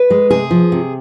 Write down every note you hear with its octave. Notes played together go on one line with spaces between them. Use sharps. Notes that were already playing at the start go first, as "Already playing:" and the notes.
Already playing: B4
G#3
C3 G#4
F3
C3